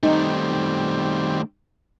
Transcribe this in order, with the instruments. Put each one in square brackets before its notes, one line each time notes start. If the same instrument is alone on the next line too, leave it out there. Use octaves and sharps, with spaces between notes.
[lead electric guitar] D#3 A3 [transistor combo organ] G3 C4 [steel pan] D#4